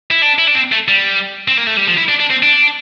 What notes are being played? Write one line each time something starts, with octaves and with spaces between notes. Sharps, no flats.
E4
D4
E4
D4
C4
A3
G3
C4
A#3
A3
G3
F3
E4
D4
D4
C4
D4